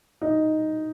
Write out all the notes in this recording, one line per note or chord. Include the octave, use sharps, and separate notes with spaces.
D#4